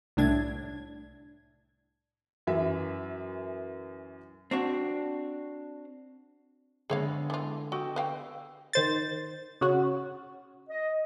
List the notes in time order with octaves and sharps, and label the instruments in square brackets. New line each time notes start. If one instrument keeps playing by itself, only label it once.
[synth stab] C2 A2 D4 G#6
[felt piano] F#2 E3 E5
[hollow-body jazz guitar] C4 D4 F#4
[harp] D3 G#3 B3 [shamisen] G#4 C#5 F5
[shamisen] E3 F4 [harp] A4
[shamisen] F#4 [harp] G4 D#5 E6
[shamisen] B4 F5 G5
[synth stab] D#3 C5 A6
C#3 F#4
[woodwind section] D#5